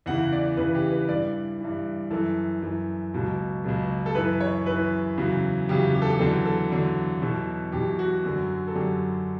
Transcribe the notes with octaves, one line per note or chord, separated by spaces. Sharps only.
E2 C#3 E3 F#5
D5
E2 C#3 E3 B4
G4
B4
G2 E3 D5
G2 E3
F#2 E3 A4
F#2 E3
C#2 B2 F#3
C#2 B2 F#3
A4
F#2 E3 B4
C#5
F#2 E3 B4
E2 C#3 F#3
E2 C#3 F#3 G4
G4
A4
G4
E2 D3 F#3 A4
A4
E2 D3 F#3
E2 B2 F#3
E2 B2 F#3 G4
F#4
F#2 D3 F#3
A4
F#2 D3 F#3 G4